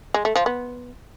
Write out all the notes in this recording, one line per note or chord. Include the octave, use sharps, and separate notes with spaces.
G#3
A3
F3
B3